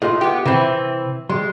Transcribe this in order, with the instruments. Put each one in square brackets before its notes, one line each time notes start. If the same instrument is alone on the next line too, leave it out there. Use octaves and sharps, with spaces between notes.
[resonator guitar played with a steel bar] A2 [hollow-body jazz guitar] F4 G#4 D#5
[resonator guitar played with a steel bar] B3 G4
[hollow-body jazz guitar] C3 B5 [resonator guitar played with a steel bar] E3 C4
[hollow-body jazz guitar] G3 C6 [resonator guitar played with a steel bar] G#3